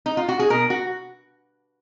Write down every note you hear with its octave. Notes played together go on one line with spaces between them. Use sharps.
D#4
F4
F#4
G#4
B2 A#4
F#4